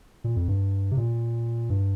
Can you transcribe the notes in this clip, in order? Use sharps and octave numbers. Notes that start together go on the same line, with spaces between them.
A#2
F2
G2
C3
A#2
G2